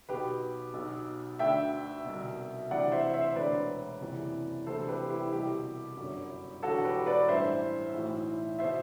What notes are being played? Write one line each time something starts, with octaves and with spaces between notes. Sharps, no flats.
B1 B2 G4 B4
B1 B2
D2 D3 E5 G5
C2 B2
D2 C3 E3 D5 F#5
C5 E5
C5 E5
E1 D2 D3 B4 D5
F#1 E2 C3 E3
D2 C3 E3 A4 C5
G4 B4
E4 G4
C2 B2 E4 G4
G1 F#2 D3
E1 E2 D3 F#4 A4
G4 B4
B4 D5
A1 G2 E3 C5 E5
B1 A2 E3
B2 C5 E5